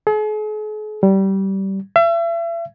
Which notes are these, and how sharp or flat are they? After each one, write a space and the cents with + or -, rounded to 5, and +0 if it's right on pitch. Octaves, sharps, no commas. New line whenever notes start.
G#4 +45
G3 -20
E5 +35